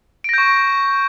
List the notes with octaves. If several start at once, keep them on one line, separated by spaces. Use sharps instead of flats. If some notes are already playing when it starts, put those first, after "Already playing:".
C#6 G6 A#6 D7